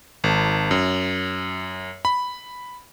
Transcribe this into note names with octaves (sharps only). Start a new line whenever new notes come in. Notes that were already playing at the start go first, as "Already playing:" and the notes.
G#1
F#2
B5